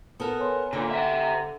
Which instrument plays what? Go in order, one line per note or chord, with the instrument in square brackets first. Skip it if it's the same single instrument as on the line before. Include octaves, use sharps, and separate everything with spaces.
[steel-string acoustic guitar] B3 A4 A#4 [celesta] D#6
[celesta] C#5 G#5 C6
[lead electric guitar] A#2 [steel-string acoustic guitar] D3
[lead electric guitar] C5 E5 [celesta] F#5